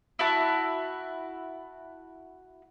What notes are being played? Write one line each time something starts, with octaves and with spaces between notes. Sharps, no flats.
E4 F#4 A5